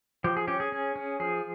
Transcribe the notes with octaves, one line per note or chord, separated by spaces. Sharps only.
F3 G4
G#4
C#4 G4
G#4
C#4
C#4
F3 G#4